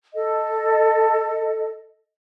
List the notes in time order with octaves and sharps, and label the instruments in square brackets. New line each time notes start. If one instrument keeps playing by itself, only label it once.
[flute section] A4 D#5